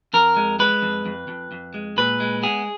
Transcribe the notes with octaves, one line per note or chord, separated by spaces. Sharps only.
F2 A#4
G#3
G#3 B4
F2
F2
F2
F2
G#3
A#2 B4
G#3
B3 G#4